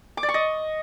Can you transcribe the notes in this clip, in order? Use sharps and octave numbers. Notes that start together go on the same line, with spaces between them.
D6
D5
C#6
D#5